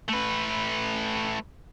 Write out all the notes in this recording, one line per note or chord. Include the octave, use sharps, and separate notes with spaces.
A3 B4